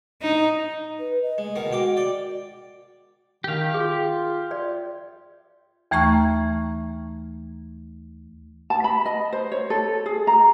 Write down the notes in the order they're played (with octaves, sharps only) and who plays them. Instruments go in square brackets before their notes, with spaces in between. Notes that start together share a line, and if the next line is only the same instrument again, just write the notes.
[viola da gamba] D#4
[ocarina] B4
D#5
[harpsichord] G#3
B2 D#3 A#4
[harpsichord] G#2 G5 D6 [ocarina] F#4
[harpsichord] D5 G5
[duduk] D#3 [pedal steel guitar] G4 F5
[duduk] F4 [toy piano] G#4
[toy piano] D5
[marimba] D#2 E3 A3 A#5 C#6 F6
[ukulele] A5
B5
D#5
C5
C#5
A4
G#4
A#5